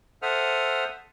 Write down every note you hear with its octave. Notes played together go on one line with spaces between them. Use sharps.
A4 C5 E5 F#5 D#6 F6